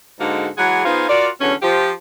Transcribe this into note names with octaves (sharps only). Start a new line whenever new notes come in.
G#2 D3 G#3 A#3 D#4 F#4
E3 F#3 G#3 G#4 F#5
B3 D#4 F4 G#4 C5 F5
F4 F#4 A#4 D5
E2 D3 F#3 C#4
F3 G4